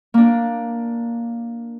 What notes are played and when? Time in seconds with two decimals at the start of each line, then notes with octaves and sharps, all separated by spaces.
0.14 A#3 D4